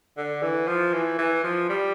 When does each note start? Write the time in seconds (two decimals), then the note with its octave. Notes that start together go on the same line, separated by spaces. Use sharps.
0.18 D3
0.43 E3
0.68 F3
0.94 E3
1.18 E3
1.44 F3
1.69 G3